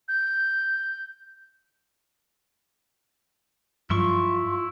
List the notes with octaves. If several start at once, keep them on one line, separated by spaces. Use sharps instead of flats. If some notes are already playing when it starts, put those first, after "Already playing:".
G6
G2 F3 F#3 E4 F4 C6 C#6